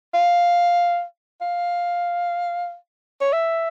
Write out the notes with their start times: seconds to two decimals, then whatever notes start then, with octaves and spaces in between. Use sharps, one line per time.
0.14 F5
1.41 F5
3.21 C#5
3.33 E5